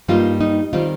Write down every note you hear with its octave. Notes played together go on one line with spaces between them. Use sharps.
G2 G3 A#3 D#4 F4
D#4
D#3 G3 C4 D#4 F4